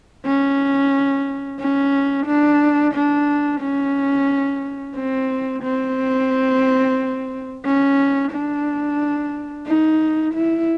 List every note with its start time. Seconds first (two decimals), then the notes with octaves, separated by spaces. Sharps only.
0.25 C#4
1.59 C#4
2.27 D4
2.94 D4
3.61 C#4
4.96 C4
5.63 C4
7.64 C#4
8.32 D4
9.66 D#4
10.34 E4